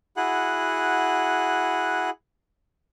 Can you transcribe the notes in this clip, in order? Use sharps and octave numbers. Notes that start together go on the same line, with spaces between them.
E4 F#4 G#4 F#5 F#6